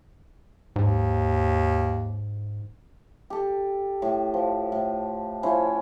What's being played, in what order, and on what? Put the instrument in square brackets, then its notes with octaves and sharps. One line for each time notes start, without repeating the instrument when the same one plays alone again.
[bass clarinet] D#2 [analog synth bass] G#2
[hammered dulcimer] G4 A4
A2
F3
A2
F3 C#4 E4 C5